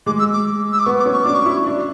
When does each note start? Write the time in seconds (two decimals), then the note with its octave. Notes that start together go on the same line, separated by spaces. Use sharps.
0.06 G#3 D6
0.19 E6
0.33 D6
0.72 E6
0.79 D6
0.86 B3 C#6
0.99 D6
1.06 C#4
1.13 C#6
1.24 D4 D6
1.34 C#6
1.46 E4
1.67 D4